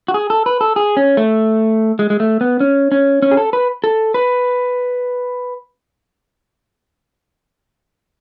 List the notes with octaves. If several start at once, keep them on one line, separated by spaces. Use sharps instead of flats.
F#4
G#4
A4
B4
A4
G#4
C#4
A3
G#3
G#3
A3
B3
C#4
C#4
C#4
G#4
A4
B4
A4
B4